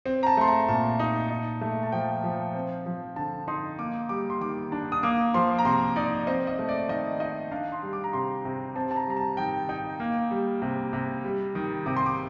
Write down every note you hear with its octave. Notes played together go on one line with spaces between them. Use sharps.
C4
A#5
A5
A3 C6
A#5
A#2 A5
D#4
D#4
A3
A5
F3 G5
F3
C4
F3
D3 A5
D#4 C6
A#3 D6
G3 D6
C6
D#3 D6
D4
D#6
A#3 D6
F3 C6
A#5
C3 C6
D#4 D5
C4 D#5
D#5
A3
D5
D#3 D#5
D#4 D#5
D4 F5
C6
G3
D6
A#5
C3 C6
C3
C4 A5
A5
A#5
G3 A#5
A5
D#3 G5
D#4 G5
A#3
G3
C3
C3
G3
D#3
C3 D6
C6
D6